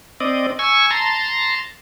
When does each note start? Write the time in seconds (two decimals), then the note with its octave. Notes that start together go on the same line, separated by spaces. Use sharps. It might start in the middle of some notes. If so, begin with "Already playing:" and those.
0.20 C4 D5 D#5
0.59 G#5 C#6 E6
0.91 A5 A#5 C6